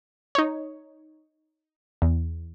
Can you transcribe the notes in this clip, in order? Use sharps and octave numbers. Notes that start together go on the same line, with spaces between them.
D#4 C#5
E2